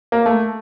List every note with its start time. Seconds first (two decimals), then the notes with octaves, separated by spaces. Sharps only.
0.12 A#3
0.26 A3